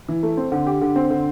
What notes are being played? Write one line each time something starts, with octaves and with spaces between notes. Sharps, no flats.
E3
A3
C4
D3
G4
D3
C4
D3